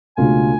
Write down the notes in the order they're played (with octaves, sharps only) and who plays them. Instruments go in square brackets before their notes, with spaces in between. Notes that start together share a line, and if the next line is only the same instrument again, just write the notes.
[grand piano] C#2 B2 A3 D4 F4 [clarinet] G#5